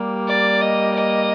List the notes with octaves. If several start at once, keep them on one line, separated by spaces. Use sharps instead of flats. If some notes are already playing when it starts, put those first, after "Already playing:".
Already playing: G3 A#3
D5
D#5
D#5